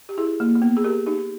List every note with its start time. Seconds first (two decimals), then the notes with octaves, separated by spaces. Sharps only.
0.09 G4
0.18 E4 G#4
0.40 A#3
0.55 A#3
0.62 B3
0.77 G#4
0.84 G4 A#4
1.06 D#4 G4